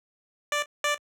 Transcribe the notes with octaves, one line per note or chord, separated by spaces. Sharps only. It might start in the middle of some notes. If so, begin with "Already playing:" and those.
D5
D5